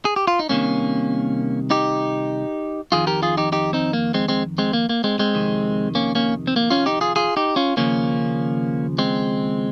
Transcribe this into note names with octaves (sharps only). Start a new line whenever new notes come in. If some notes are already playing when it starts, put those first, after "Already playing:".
G#4
G4
F4
D#4
C2 C3 D#3 A#3 C#4
D#4 G4
F2 D#3 F4 G#4
G4 A#4
F4 G#4
D#4 G4
D#4 G4
C4 D#4
A#3
G#3 C4
G#3 C4
G#3 C4
A#3
A#3
G#3 C4
G#3 C4
F2 C3 D#3
A#3 C#4
A#3 C#4
C4
A#3
C#4 F4
D#4 G4
F4 G#4
F4 G#4
D#4 G4
C#4 F4
D#2 C#3 F3 A#3 C#4
G#3 C4